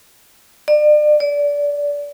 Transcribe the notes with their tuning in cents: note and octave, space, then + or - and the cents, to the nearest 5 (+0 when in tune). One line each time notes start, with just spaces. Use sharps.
D5 +35
D5 -20